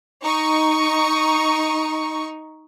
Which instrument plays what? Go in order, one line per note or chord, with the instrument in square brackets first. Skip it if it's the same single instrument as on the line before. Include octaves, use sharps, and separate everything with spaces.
[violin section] D#4 C#6